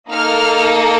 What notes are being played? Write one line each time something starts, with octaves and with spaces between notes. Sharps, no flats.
A#3 D#4 A4 F6